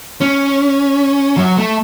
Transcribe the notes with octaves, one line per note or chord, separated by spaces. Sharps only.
C#4
F#3
A3